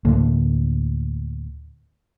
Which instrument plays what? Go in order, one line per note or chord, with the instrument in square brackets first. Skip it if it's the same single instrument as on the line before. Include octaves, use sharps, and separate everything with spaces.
[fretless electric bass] D2 A2 D3 A#3